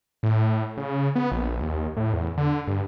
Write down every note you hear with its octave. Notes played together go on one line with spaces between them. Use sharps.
A2
C#3
B3
A#1
D#2
A2
E2
D3
G2